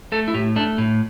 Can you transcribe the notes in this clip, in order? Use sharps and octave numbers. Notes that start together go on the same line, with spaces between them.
A3 A4
E4
A2 G4
A3 D4
A2